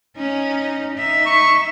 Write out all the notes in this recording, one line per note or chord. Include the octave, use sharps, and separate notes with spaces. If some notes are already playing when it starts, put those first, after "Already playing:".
C#4 D#4
D#4 E5
C#6